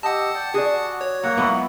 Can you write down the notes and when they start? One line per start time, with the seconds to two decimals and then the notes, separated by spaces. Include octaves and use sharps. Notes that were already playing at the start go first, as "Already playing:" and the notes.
0.03 G4 D#5 F#5 A5 E6
0.34 D5 G5
0.54 F#4 G#4 D5
1.01 C#5
1.23 F#3 A#3 F#5 A#5
1.37 C#2 F#3 B3 E4